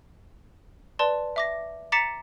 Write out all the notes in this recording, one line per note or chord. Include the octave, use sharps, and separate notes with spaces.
B4 D5 A5 C6
E5 D6 A#6
A#5 D6 A6 B6 C#7 E7